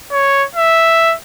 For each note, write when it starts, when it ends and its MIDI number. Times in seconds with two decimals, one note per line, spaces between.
0.11 0.45 73
0.55 1.15 76